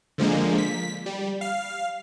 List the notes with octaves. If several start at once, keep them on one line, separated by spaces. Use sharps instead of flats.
D3 F3 G#3 A#3
B6
G3
F5